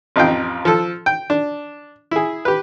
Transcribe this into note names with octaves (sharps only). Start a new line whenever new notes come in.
A1 F2 D#4 F4 F5 G5
F3 A4
G5
D4
E4 G#4
G4 B4